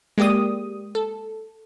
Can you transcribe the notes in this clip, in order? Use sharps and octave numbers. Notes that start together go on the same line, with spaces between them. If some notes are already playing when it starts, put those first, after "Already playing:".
G#3 A#3 G4 D5 D#6
A4